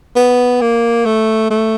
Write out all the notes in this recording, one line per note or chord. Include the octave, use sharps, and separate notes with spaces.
B3
A#3
A3
A3